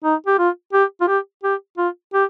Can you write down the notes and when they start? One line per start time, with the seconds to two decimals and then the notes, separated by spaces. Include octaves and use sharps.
0.04 D#4
0.27 G4
0.39 F4
0.73 G4
1.01 F4
1.08 G4
1.44 G4
1.78 F4
2.14 G4